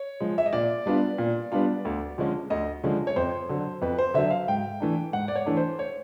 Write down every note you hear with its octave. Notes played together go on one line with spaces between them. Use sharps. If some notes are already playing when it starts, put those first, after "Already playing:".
Already playing: C#5
F3 G#3
E5
D#5
A#2 D5
G3 B3 D4 F4
A#2
G3 B3 D4 F4
D2
D3 F3 G#3 C#4
D2 D#5
D3 F3 G#3 C#4
C#5
F2 C5
D3 F#3
F2 B4
C5
D3 F#3 E5
F5
G#2 G5
E3 A3 D4
G#2 F#5
D5
C#5
E3 A3 D4
C5
C#5